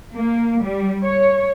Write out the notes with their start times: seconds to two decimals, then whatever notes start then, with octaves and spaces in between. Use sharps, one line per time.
0.16 A#3
0.62 G3
1.05 C#5